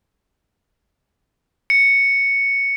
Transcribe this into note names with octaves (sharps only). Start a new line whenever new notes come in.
C#7